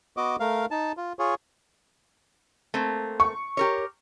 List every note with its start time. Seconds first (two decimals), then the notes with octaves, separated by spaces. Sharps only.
0.17 B3 F#4 D#5 D6
0.40 A3 A#4 F5
0.71 D#4 A5
0.97 F4
1.19 F4 G#4 C#5
2.74 A3 A#3 C4
3.20 C#6
3.57 G4 A#4 C#5